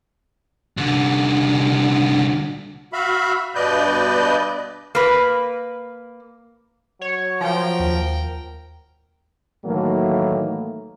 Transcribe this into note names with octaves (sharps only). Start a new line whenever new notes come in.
C2 D3
F#4 E5 F5 B5
G2 B2 B4 D5 D#5 G6
A#3 B4
F#3 C#5
F3 A#4 G5
D#2
A2 D#3 E3 F#3 A3 A#3